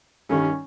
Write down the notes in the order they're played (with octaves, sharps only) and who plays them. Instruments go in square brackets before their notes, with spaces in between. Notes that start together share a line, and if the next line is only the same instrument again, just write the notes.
[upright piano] G2 D#3 G3 [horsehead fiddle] C#4